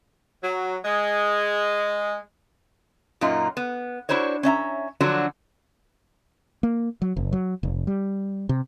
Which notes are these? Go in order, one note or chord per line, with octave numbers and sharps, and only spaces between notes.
F#3
G#3
F#2 A#2 A#3 D#4 F4
B3
D4 E4 F#4 C5 C#5
C#4 D4 E5 A#5
D3 F3 F#3 D4 F#4
A#3
F#3
F#1
F#3
F1
G3
C3